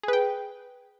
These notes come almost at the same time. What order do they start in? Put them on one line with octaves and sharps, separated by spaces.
G#4 B4 G5